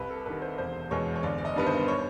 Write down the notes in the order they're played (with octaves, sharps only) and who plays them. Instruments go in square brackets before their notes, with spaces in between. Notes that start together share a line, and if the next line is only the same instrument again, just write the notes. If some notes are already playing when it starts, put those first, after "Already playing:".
Already playing: [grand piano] C2 B4
A4
C3 D#3 B4
C5
E1 C5
E2 B2 G#3 C#5
C#5
G1 D5
D5
D#5
G2 D#3 G3 B3 B4
C5
C#5